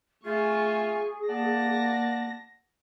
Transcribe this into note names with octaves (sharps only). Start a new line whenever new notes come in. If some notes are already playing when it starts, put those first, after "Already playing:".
A3 F4 G#4 G#5 C#6
A#3 D5 F#5 A5 A#6